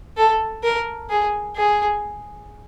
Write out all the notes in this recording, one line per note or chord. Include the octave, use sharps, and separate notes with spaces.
A4
A#4
G#4
G#4